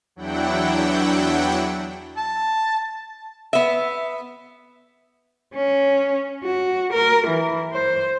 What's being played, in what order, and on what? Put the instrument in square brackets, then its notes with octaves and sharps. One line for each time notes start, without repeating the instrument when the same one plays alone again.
[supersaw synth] E2 F#3 D4 E4 F#5 G5
[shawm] A5
[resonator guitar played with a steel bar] B3 E5
[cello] C#4
F#4
A#4
E3
C5